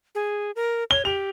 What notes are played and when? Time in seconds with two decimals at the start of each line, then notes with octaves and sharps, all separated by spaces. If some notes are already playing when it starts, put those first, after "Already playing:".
0.15 G#4
0.56 A#4
0.91 C#5 G7
1.05 G4 F7